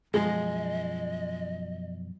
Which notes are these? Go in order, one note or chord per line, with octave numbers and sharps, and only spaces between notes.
F#2 B2 F3 G#3 D#5